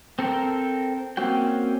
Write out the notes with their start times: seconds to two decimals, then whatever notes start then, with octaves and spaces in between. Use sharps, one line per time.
0.19 C4 A4 A#4 G5
1.17 A#3 C4 C#4 F#4 G5